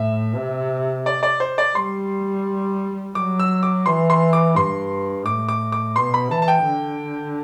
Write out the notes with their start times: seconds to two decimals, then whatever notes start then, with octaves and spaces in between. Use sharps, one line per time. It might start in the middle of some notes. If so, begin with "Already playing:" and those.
Already playing: A2 E5
0.36 C3
1.06 D5
1.23 D5
1.40 C5
1.58 D5
1.75 G3 C6
3.15 F#3 D6
3.39 E6
3.63 D6
3.86 E3 C6
4.10 C6
4.33 D6
4.55 G2 C6
5.26 A2 D6
5.49 D6
5.72 D6
5.96 B2 C6
6.14 B5
6.31 E3 A5
6.42 A5
6.48 G5
6.66 D3